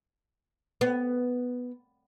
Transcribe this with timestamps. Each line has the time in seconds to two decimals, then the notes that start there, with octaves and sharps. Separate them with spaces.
0.81 B3